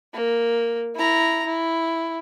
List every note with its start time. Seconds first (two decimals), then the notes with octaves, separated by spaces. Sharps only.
0.14 A#3
0.96 E4 A#5
1.46 E4